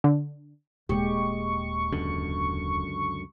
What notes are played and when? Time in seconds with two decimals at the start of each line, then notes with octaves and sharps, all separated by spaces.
0.04 D3
0.89 D#1 G#3 G4 C#6
1.92 C#2 F#2 D3